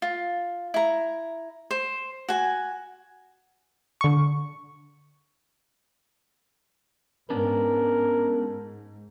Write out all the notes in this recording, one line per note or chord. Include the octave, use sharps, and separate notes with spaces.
F4
E4 A#5
C5
F#4 G#5
D3 C#6
G#2 B3 C#4 D4 A#4